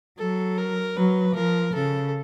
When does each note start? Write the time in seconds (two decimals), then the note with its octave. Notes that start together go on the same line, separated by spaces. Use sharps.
0.19 F#3 A4
0.58 A#4
0.97 F#3 B4
1.36 F3 A#4
1.75 C#3 A4